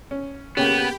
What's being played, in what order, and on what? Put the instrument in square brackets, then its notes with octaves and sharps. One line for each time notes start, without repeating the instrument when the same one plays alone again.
[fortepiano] C#4
[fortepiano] C#3 A#3 C#4 [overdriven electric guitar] B3 [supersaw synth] G4 G5 B5